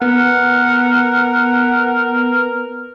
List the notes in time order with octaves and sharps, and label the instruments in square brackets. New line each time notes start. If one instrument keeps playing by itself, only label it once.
[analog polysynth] B3 [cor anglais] A#4 [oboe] F#5